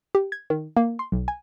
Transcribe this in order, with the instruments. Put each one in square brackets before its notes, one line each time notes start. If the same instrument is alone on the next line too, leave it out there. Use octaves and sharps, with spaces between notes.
[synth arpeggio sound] G4
G#6
D#3
A#3
C6
B1
G#5